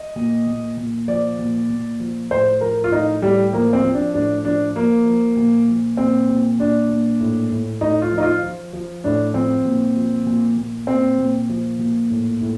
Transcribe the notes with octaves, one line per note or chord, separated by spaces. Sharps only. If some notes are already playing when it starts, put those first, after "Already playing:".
Already playing: D#5
A#2
A#2
A#2
F3 D5
A#2
A#2
F3
A2 C5
F3 A#4
F4
A2 D#4
A2 G3
F3 A#3
C4
F3
D4
A2 D4
F3 D4
F3 A#3
F3
A#2
F3
A#2 C4
A#2
A#2 D4
A#2
A2
A2
A2 D#4
F4
F3
D#4
F4
F3
F3
A2 D4
F3 C4
A#2
F3
A#2
A#2
A#2 C4
A#2
F3
A#2
A2
A2